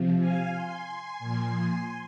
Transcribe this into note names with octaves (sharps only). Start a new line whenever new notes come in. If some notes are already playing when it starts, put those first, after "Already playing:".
Already playing: C3 F3
F5 G#5
G#5 C6
A#2 F3